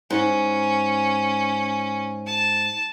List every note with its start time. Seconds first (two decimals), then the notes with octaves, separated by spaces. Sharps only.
0.10 G#2 C#4
2.26 A5